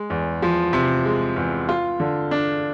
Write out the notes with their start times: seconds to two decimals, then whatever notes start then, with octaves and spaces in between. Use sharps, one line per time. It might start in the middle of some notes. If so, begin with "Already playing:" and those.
Already playing: G#3
0.10 E2
0.42 F3
0.73 C3
1.05 G#3
1.36 E2
1.69 F4
2.00 D3
2.31 D4